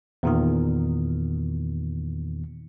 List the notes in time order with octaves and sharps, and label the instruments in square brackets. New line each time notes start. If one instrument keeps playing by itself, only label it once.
[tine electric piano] E2 A#2 D#3